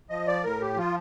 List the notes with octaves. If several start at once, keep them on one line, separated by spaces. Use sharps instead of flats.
F3 D#5
D5
A2 A#4
G4
F3 F4